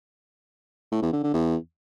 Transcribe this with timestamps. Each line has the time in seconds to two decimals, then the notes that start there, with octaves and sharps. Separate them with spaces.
0.92 A2
1.02 E2
1.13 D3
1.23 D3
1.34 E2